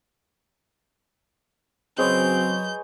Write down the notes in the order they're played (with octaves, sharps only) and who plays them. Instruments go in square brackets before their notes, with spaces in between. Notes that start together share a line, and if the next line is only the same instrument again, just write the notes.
[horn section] C#3 C4 [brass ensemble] F#3 [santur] G#3 B4 C#5 [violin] G6